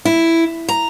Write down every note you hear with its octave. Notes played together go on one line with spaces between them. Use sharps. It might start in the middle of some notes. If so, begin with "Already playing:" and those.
E4
A#5